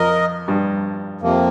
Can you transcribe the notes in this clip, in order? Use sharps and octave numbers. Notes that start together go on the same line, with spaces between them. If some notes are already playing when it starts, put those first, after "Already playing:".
Already playing: F2 A#4 D#5
G2
F2 C3 F3 A#3